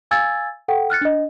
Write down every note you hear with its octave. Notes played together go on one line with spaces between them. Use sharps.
F5 G#5 E6 G#6 A6
A4 F#5 G5
F6 F#6 A6 C#7
D4 D#5